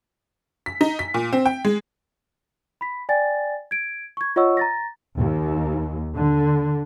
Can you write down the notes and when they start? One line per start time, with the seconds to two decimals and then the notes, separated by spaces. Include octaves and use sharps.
0.66 B6
0.81 D#4
0.99 B6
1.14 A#2
1.33 C4
1.46 G5
1.65 G#3
2.81 B5 B6
3.09 D5 G5 G#5 A6
3.71 G#6 D7
4.17 C#6 G#6
4.36 F4 C#5 D#5 F#5 C#6 E6
4.57 A#5 A6 A#6
5.19 D#2
6.15 D3